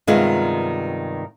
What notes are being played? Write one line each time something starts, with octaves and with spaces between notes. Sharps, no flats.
G2 C3 D#3 G#3 B3 F4